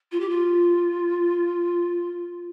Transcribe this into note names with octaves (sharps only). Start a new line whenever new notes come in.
F4
G4
F4